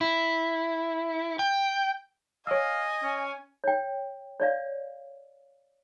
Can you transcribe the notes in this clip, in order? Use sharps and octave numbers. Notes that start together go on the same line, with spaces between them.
E4
G5
C#5 D#5 F5 G#5 E6
C#4
C#5 G5
C#5 D5 F5